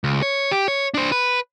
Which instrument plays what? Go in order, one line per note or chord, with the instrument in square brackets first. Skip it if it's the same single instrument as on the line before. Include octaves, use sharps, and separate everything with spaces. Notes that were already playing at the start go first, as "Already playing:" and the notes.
[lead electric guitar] C#2
C#5
G4
C#5
D4 C5
B4